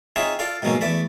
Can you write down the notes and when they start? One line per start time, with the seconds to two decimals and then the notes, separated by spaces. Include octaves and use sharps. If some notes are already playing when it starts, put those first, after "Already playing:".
0.16 C4 D#4 F4 G#4 C#5 E5
0.39 F4 A4 D5 F5
0.62 G#2 B2 F3 F#3 A#3 C#4
0.81 E2 A3 D5 B5